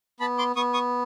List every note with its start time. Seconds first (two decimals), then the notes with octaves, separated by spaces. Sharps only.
0.20 B3 A5 B5
0.38 C6 D6
0.56 B3 C#6 D#6
0.74 C#6 D#6